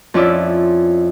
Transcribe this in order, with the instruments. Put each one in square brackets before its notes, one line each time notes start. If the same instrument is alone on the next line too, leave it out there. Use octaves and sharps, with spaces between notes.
[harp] F2 C#4 E4 F4 D5 E5